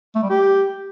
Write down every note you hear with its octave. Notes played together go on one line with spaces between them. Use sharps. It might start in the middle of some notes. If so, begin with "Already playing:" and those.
A3
G3
G4